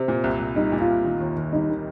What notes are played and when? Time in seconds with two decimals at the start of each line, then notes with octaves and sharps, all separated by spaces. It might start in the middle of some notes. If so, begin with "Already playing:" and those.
Already playing: C3 C4
0.08 A#2
0.24 C2
0.39 C2
0.56 G3 D#4
0.72 A#2
0.80 F4
0.88 C2
1.04 D#3
1.20 D#2
1.36 D#2
1.52 G3 D#4
1.69 D#3